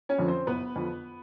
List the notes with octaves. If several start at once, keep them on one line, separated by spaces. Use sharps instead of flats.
C#4 C#5
F2 D3 F3
C4 C5
F#1 B3 B4
F2 D3 F3